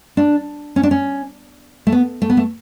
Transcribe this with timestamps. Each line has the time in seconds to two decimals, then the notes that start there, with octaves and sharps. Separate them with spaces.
0.17 D4
0.76 C#4
0.83 D4
0.91 C#4
1.87 A3
1.92 B3
2.22 A3
2.30 B3
2.37 A3